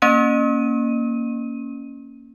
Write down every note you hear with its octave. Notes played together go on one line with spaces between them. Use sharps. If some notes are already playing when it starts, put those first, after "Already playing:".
A#3 C#4 D#7